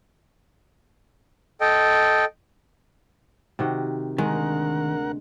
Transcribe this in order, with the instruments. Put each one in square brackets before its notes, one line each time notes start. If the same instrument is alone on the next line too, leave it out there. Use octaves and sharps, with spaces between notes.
[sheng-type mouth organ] A4 D#5 G5
[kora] C3 D#3 F#4
[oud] D2 [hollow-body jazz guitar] D#3 [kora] G#3 [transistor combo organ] A#4 F#5